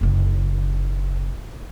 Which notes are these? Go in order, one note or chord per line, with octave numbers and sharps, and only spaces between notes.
F#1 C#3